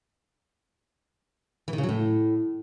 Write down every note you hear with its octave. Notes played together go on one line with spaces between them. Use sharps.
E3
D#3
C#3
F#3
A2